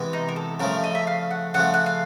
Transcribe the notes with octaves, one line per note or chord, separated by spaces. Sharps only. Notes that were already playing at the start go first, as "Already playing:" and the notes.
Already playing: C3 E3 G#3 B3
D#4
A#4
A4
C#3 F3 A3 A#4
D#5
E5
F5
F#5
C#3 F3 A3 F#5
F#5
F5